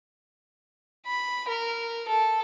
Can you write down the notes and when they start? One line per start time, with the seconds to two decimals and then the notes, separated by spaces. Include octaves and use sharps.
1.07 B5
1.48 A#4
2.08 A4